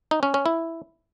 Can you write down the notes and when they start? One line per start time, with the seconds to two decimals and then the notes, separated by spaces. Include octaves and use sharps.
0.11 D#4
0.23 C#4
0.34 C#4
0.46 E4